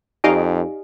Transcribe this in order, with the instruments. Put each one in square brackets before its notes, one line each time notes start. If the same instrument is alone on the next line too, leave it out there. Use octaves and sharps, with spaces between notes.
[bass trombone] F2 [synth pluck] D#4 D#5 F5 [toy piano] G4 D5 G#5